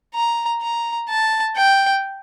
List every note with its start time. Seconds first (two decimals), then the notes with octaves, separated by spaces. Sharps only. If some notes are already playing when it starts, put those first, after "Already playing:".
0.15 A#5
0.62 A#5
1.09 A5
1.56 G5